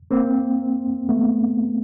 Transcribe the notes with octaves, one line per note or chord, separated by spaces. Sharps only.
A#3 C4
A3 B3